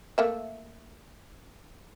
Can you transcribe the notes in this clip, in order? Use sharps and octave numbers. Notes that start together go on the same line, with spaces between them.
A3 A#3 E5